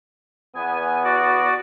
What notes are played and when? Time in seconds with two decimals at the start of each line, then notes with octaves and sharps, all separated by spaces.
0.55 E2 B3 G#5
1.04 F#4 D5